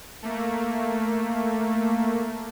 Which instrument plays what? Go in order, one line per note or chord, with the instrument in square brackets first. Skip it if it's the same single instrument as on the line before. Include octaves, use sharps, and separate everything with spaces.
[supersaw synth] A3 A#3